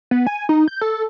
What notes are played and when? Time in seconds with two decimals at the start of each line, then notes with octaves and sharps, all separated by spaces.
0.11 B3
0.27 G#5
0.49 D#4
0.68 G6
0.81 A4